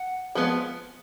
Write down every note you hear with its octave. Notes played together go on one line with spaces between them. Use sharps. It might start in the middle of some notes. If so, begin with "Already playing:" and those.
Already playing: F#5
F3 G#3 B3